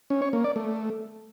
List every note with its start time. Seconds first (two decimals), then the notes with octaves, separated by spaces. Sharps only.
0.10 C#4
0.22 C#5
0.33 A#3
0.44 D5
0.56 A3